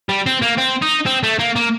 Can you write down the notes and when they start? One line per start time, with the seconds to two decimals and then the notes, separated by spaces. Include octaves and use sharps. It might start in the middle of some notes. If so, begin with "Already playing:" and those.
0.09 G3
0.26 C4
0.42 A#3
0.58 C4
0.82 D#4
1.06 C4
1.23 A3
1.39 A#3
1.56 A#3